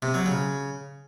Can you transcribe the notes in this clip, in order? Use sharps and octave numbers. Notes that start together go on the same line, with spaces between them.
C3
F#3
C#3